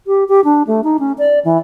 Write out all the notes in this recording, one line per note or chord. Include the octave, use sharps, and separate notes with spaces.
G4
G4
D4
A3
D#4
C#4
D5
E3